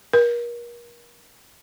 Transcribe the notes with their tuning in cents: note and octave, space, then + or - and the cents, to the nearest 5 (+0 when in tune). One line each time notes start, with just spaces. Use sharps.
A#4 +35